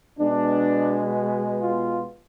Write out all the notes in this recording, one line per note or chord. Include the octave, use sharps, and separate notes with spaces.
B2 G#3 B3 D4
F4